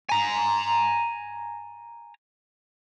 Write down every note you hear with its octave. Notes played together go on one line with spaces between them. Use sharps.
G#5 A#5